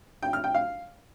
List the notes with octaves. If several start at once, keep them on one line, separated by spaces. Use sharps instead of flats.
G5
F6
G5
F5